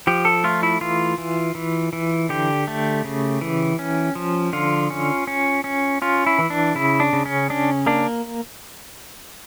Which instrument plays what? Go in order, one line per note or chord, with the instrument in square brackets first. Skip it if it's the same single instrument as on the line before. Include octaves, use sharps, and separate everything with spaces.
[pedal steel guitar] F3 G4
A4
A3 F4
E4
E3 F4
E3
E3
E3
D3 G4
A3
C#3
E3
C#4
F3
D3 F4
C#4
C#4
C#4
C#4 F4
E4
E3
D4
C#3 E4
D4
C#3
C#4
C#4 D4
A#3 D4